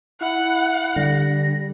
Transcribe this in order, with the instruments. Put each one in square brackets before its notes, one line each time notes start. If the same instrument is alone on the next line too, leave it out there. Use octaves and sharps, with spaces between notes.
[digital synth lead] E4 [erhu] F#5 [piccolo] F#6
[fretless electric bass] D3 [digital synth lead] G3 [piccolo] A#6